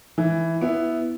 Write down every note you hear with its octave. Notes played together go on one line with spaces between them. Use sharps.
E3
B3 E4